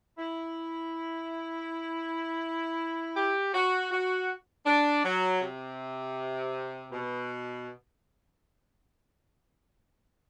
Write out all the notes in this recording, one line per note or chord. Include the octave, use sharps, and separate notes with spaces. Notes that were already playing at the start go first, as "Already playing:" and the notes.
E4
G4
F#4
F#4
D4
F#3
C3
B2